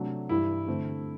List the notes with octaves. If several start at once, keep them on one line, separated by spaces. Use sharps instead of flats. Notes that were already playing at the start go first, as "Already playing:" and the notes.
Already playing: C3 F#3 A3 D4
G2 E3 G3 E4
D3 A3 C4